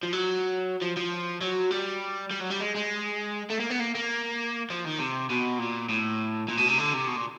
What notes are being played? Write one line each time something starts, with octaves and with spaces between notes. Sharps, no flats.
F3
F#3
F3
F3
F#3
G3
G3
F#3
G3
G#3
G#3
A3
A#3
B3
A#3
A#3
F3
D#3
C3
B2
A#2
A2
A#2
B2
C3
D3
C3
B2
A#2